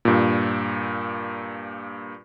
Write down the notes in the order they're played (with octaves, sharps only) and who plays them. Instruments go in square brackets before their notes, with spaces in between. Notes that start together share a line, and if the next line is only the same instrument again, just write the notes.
[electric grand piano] G2 A#2